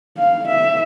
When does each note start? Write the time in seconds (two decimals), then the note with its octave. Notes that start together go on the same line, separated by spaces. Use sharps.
0.18 F5
0.48 E5